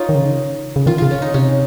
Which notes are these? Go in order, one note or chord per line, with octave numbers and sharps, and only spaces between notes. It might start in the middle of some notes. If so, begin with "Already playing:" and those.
Already playing: D#4 F4 C#5
D#3
C#3
C#3
D#3 F4
C#3 F4
C#4
D#4
C3 C#4